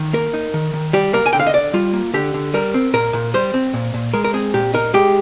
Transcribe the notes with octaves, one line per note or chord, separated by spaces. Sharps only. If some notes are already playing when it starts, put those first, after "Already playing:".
Already playing: D#3
A#3 A#4
D#4
D#3
D#3
G3 G4
A#3 A#4
G#5
D3 G5
F5
D#5
D3 D5
G3 F4
A#3
D3 G4
D3
G3 A#4
C4
A#2 A#4
A#2
G3 C5
C4
A#2
A#2
G#3 A#4
A#4
C4 G#4
A#2 G4
D#4 A#4
G#3 G4